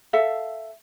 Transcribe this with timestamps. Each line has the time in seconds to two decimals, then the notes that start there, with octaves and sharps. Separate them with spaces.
0.13 A4 E5 F5